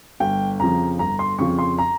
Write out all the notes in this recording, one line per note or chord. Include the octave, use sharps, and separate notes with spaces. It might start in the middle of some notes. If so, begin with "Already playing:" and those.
G1 G5
F2 C#3 F3 A#5
G1 A#5
C6
F2 C#3 F3 C#6
C6
A#5